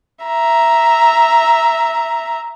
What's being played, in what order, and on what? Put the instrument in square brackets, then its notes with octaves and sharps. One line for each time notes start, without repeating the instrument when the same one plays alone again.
[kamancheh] E5 A#5